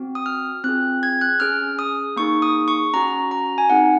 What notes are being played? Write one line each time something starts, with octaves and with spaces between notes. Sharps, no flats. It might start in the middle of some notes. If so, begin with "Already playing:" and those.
Already playing: C4 F#4
D#6
F6
C4 F4 G#4 F#6
G#6
F#6
C#4 G#4 F6
D#6
A#3 D#4 G#4 C#6
D#6
C#6
C#4 F#4 A#5
A#5
G#5
C4 D#4 G#4 F#5